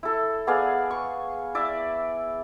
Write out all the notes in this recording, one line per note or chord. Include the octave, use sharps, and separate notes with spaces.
E4 A4
B3 G#4 D5 F5
C#6
E4 D5 E5